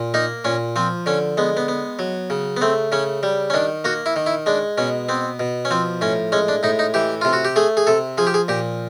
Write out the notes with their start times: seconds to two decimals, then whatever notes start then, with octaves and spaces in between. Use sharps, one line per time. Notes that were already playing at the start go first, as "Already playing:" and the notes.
Already playing: A#2
0.14 A#3 D#4
0.45 A#2 C#4
0.76 F3 C4
1.06 D3 C#4
1.37 G#3 B3
1.57 B3
1.68 B3
1.99 F#3
2.30 C#3
2.57 B3
2.61 A3 C4
2.92 C#3 C#4
3.23 G3
3.50 C#4
3.54 D#3 D4
3.84 A#3 F#4
4.06 E4
4.16 D#3
4.26 E4
4.46 G#3 D4
4.78 B2 C#4
5.09 B3 C4
5.40 B2
5.65 C#4
5.71 F3 C4
6.01 A2 C#4
6.32 G#3 C#4
6.48 D4
6.63 A2 D#4
6.79 D#4
6.94 E3 G4
7.21 C3 F4
7.33 F#4
7.45 G4
7.56 A3 G#4
7.77 G#4
7.87 C3 A4
8.18 F3 G#4
8.27 G4
8.34 G#4
8.48 A#2 G4